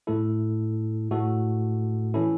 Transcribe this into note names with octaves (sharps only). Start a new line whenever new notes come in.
A2 A3 E4 A4
A2 A3 F#4 A4
E3 C#4 E4 A4